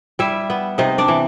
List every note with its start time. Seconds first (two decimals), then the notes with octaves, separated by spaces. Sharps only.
0.19 G3 E4 E5
0.50 B3
0.78 C3 D#4 D#5
0.98 D4 D5
1.08 E3